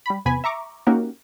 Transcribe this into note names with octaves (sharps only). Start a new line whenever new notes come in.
G3 B5
E2 C3 B3 G#5 B5
E5 A#5 C#6 D6
A#3 C#4 D#4 F#4 G4 A#4